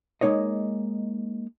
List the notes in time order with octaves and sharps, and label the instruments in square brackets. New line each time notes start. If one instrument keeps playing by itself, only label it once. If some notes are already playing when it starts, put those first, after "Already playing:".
[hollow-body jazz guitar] G#3 A#3 D#4 C#5 D#5